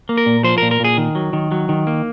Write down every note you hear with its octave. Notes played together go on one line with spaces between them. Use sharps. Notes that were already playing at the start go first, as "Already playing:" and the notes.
A#3
A#4
A#2
F3 C5
A#4
A#2
A#4
A#2 G#4
D#3
F#3
D#3
F#3
D#3
A#3